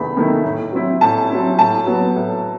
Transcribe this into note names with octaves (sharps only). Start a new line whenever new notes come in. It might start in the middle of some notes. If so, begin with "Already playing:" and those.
Already playing: E2 C3 D#3 A3 E4 B5
C3 D#3 A3 E4
A2
F#3 C4 E4
A2 A5
F#3 C4 E4
A2 A5
F#3 B3
A2